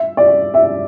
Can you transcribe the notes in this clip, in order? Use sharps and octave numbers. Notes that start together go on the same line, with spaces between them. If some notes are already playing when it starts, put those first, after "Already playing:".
Already playing: E5
D5
E5